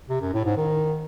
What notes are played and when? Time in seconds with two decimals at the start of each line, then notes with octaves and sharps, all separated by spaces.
0.10 C3
0.21 F#2
0.33 A2
0.45 G#2
0.57 D#3